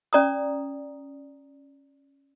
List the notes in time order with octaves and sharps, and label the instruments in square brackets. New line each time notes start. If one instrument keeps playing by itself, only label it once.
[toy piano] C#4 D5 A#5 D#6